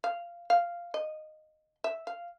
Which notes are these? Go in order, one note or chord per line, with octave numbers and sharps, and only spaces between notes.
F5
F5
D#5
E5
F5